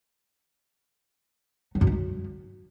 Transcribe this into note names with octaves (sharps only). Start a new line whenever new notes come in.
F#3
F#2
D#3
F#2